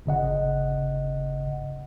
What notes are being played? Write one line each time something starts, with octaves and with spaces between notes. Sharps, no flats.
G1 C#3 D#5 F#5